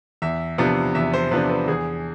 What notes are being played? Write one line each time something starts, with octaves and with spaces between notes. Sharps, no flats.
E2 E5
C3 F3 B3 D4
E2 E5
C5
C3 F3 B3 D4 B4
B4
E2 G#4